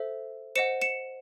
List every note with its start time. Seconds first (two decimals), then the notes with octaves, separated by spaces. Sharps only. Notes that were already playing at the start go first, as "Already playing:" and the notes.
Already playing: A4 C5 E5
0.56 C5 D#5 F#5 C#7 E7
0.81 C#7 E7